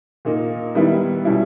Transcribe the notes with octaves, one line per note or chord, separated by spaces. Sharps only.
A#2 A#3 D#4
D#3 G3 B3 E4
B2 G3 C#4 E4